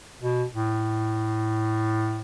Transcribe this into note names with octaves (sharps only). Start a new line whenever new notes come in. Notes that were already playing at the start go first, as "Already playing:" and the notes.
B2
A2